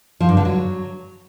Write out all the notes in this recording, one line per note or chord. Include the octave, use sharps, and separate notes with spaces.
F3
G2
D3
F#3